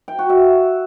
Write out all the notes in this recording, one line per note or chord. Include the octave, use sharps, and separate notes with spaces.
G5
F#4
E5